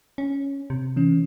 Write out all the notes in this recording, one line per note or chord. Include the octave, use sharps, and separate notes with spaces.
C#4
C3
E3 C#4